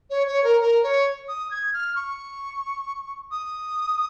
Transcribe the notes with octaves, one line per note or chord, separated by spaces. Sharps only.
C#5
C#5
A#4
A#4
C#5
D#6
G#6
F6
C#6
D#6